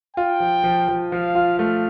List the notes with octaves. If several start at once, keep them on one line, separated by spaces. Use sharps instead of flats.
F4 G5
F3
F3
F3
F3 F5
F4
A3 F5